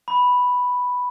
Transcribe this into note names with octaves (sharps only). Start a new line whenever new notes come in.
B5